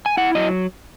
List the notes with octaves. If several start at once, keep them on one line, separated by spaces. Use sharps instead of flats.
G#5
E4 F#5
F#3 D#5